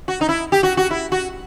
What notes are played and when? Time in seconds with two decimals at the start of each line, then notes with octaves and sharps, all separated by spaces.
0.08 F#4
0.21 D#4
0.29 E4
0.52 G4
0.63 F#4
0.77 F#4
0.91 E4
1.12 F#4